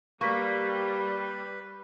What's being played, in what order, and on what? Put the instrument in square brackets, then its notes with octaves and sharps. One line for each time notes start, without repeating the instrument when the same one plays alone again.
[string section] G3 [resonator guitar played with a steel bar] A#3 [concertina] B4 [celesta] C#6 B6